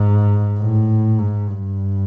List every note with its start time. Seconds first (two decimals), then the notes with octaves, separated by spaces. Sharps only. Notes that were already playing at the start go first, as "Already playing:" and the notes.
Already playing: G#2
0.60 A2
1.19 G#2
1.48 G2